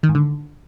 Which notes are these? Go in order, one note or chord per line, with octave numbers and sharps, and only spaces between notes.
D#3
G#2
D3